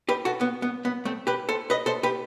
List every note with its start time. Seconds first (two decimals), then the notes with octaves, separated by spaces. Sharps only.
0.09 G4 B4
0.25 F#4 A4
0.41 B3
0.62 B3
0.85 B3
1.05 A3 C4
1.27 G4 B4
1.49 A4 C5
1.70 B4 D#5
1.86 A4 C5
2.03 G4 B4